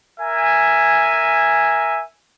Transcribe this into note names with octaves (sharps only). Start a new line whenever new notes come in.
A#4 E5 G#5